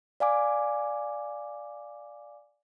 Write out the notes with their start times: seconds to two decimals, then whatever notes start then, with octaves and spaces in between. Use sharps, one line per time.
0.20 D5 F5 G#5 D6